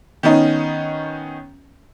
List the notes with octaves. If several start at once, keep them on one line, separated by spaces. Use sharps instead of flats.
D#3 B3 C#4 D#4